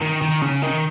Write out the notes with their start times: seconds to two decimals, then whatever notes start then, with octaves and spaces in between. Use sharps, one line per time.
0.02 D#3
0.22 D#3
0.42 C#3
0.62 D#3